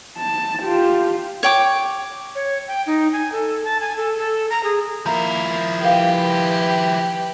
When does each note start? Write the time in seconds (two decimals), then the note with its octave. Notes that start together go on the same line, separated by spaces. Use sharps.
0.17 A5
0.62 F4 G4
1.43 C#5 G5 D6
2.35 C#5
2.68 G5
2.87 D#4
3.13 G#5
3.32 A4
3.65 A5
3.81 G#5
3.97 A4
4.18 A4
4.50 A#5
4.64 G#4
5.06 F3 A#3 E4 E5 A#5
5.81 G4 A#4 B4 F5